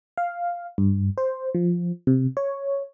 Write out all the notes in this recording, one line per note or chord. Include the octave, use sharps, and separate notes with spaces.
F5
G2
C5
F3
C3
C#5